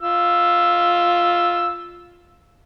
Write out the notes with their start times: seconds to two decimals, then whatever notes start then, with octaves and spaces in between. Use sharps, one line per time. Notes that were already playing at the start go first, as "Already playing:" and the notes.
0.02 F4 E6